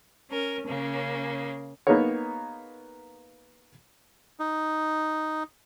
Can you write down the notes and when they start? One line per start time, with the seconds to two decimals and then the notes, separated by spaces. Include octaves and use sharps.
0.30 C#4 A#4
0.67 C#3 A#3 C#4
1.87 A#3 B3 D#4 G#4 A#4 C#5
4.40 D#4